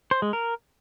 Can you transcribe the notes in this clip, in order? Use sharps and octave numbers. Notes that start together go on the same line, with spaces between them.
C5
G#3
A#4